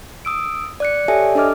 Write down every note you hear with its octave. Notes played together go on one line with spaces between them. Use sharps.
D#6 E6 D7
D5 F#6 C#7
G4 A4 C#5 D5 E5 G#5
D4 A4 D#5 D6 F6